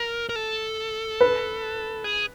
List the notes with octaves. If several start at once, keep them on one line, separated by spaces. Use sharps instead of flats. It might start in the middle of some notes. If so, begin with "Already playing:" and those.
Already playing: A#4
A#4
A4
B4
G#4